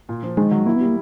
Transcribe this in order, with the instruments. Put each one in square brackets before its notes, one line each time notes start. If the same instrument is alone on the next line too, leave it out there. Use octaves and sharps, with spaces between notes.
[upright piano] A#2
F3
[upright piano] D#3 [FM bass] G#3
[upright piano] F#3
[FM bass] A#3 [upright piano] E4
[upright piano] G3 [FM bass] B3
[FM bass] A#3